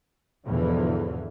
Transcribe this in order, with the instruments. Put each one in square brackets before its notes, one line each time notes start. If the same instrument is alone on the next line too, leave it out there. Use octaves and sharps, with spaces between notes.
[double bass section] E2 G#2 B2 D3 E3 F3